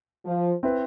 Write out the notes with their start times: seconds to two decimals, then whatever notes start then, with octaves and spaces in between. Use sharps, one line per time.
0.26 F3
0.63 C4 E4 B4